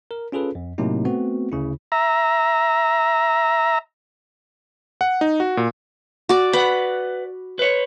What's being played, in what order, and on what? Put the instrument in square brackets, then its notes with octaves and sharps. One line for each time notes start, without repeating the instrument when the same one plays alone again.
[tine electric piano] A#4
C#4 F4 G#4 A4 B4
F2
A2 C3 F#3 A#3 D#4
A3 B3 C4 F#4
D2 C#3 E4
[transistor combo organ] E5 A#5
[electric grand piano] F#5
D#4
F#4
A#2
[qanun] F#4 D5
[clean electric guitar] B4 F#5 [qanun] B5
[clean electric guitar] B4 C#5